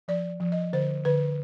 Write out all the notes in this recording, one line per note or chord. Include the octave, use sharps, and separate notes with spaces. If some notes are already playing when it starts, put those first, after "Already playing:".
F3 D5
F3
D#5
D3 C5
D3 B4